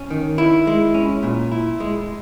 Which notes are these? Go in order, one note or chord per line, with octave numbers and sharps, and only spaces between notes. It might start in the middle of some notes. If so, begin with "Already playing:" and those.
Already playing: C#4
D#3
E4
G#3
C#4
A#2
E4
G#3